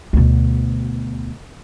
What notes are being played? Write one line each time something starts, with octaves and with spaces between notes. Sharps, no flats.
D2 B2